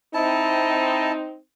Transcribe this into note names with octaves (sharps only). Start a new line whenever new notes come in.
C4 D#4 E4 A5